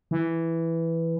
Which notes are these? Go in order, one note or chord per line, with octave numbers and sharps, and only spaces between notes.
E3